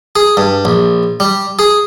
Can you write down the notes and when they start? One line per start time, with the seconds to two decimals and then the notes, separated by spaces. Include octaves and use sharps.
0.16 G#4
0.37 G2
0.65 A#1
1.20 G3
1.59 G#4